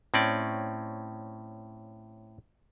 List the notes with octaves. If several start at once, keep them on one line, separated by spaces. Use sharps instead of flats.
A2 C4 C#4 D5